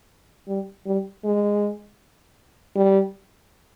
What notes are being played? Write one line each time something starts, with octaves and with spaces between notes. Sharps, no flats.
G3
G3
G#3
G3